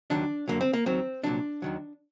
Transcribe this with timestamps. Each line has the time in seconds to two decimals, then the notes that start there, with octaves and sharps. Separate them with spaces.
0.10 D#2 D#3 F#3 D4
0.48 F#2 D3 F#3 A#3
0.61 C4
0.73 A#3
0.86 D#2 D#3 F#3 C4
1.24 C2 A#2 F#3 D4
1.62 D#2 D#3 F#3